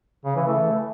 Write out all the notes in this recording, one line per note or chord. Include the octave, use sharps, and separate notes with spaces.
C#3
E3
A3